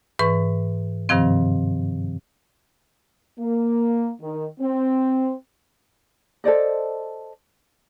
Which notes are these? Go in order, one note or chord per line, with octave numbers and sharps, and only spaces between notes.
G#2 E3 B4 C#6
G2 C3 D#3 F3 C4
A#3
D#3
C4
A4 C5 D5 D#5